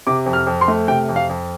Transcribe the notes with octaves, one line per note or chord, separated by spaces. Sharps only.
C3 D6
F2
F6
F2
C6
A3
C3 G5
F2
F5
F2